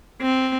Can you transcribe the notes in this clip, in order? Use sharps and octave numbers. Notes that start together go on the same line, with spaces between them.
C4